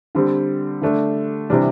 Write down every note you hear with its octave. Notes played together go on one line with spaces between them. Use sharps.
D3 G3 C4
D3 A3 D4
C3 E3 G3 D4